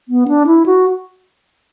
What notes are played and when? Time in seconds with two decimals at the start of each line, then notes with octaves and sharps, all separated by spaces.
0.08 B3
0.28 D4
0.46 E4
0.66 F#4